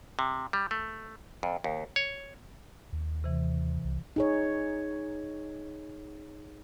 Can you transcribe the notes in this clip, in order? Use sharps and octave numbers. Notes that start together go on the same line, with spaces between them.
C3
G3
A3
F2
D#2
C#5
D#2
C3 E3
C2
D#4 G#4 C#5